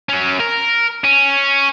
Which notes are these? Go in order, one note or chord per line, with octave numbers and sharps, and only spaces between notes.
F#3 C#4
A#4
C#4